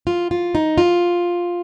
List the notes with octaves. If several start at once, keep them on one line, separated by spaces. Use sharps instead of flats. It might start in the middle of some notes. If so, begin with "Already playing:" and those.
F4
F4
D#4
F4